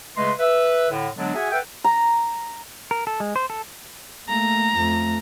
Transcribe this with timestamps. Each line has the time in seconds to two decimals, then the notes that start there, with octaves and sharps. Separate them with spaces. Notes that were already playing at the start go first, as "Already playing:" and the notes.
0.17 C#3 G#3 A3 B4 D#5 C6
0.39 B4 E5
0.90 A2 D3
1.16 D3 F#3 G#3 B3 D4
1.35 F#4 G#4 E5 F#5 G#5
1.51 A4 B4 E5 F#5 G5
1.84 A#5
2.91 A#4
3.07 A4
3.20 G#3
3.36 C5
3.50 A4
4.29 A3 A#3 A#5
4.76 F2 A3